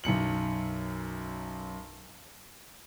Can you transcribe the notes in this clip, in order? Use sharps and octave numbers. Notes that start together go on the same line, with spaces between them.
B1 F#2 C#7 F#7